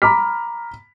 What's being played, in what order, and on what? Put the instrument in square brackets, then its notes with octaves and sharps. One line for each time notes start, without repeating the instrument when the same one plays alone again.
[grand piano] A#5 B5 D6 F6 B6